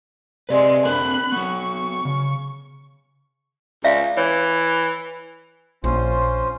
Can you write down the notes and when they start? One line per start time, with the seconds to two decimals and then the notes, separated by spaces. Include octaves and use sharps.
0.49 C3 G#3 B4 D5
0.85 C4 D4 A#4 B5 F#6
1.32 F#3 B3 C#6
2.05 C#3
3.84 C#2 D5 E5 F5
4.17 E3 C#5
5.84 A#1 C#4 F4 C5